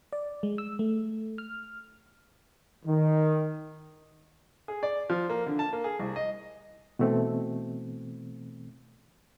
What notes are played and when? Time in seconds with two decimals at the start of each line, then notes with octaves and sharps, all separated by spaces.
0.13 D5
0.43 G#3
0.58 E6
0.79 A3
1.38 F6
2.85 D#3
4.68 G#4
4.83 D5
5.10 F3
5.30 A#3
5.46 D3
5.59 A5
5.73 A#3
5.84 G#4
5.99 C2
6.16 D#5
6.99 B2 E3 A3 C4